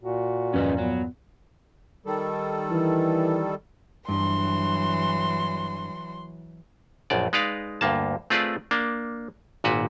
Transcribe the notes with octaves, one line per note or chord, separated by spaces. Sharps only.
A#2 F#4
E2 G2 F3 C#4 B4 D#5
F#3 B3
D#3 G3 A4
E3
G2 E3 F#3 C6
A#1 F#2 D5
G#3 D#4 B4 D5 F5
D2 G2 A#3 A5
A3 C4 F4 G#4 B4 D5
A#3 D4
G#1 A#2 F#4 B4